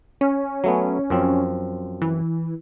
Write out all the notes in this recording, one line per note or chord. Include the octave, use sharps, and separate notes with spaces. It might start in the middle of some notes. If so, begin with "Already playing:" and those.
C#4
F#3 A3 B3
F#2 F3 C4
E3